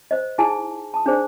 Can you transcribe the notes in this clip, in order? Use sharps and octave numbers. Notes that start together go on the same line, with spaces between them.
C5 D#5
D#4 E4 G#4 G#5 A5
A5 D#6
D4 D#4 G#4 C5 D5